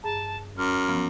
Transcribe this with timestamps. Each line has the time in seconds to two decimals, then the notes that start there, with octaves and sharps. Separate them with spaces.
0.03 G2 G#4 A5 A#5
0.58 F#2 F6
0.88 E3 F3 B3